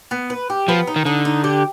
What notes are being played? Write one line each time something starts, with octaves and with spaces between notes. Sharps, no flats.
B3
B4
G4
F3 B3
D#4
D#3
D3 D#4
D#4
G4